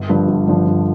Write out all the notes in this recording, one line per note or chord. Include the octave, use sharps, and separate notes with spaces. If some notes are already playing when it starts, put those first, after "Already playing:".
Already playing: G1
G2 D3 F3
G1
G2 D3 F3
G1